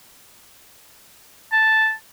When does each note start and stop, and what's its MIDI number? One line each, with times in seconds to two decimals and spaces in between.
1.52 1.92 81